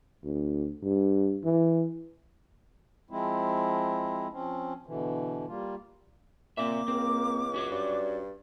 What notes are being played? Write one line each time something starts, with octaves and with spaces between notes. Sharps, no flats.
D2
G2
E3
F3 G#3 C4 E4
F3 C4 C#4
B2 D3 E3
G3 A#3 F4
A#2 A#3 C4 E5 D6
C#2 C4
C#4 F#4 C#5
G2 D5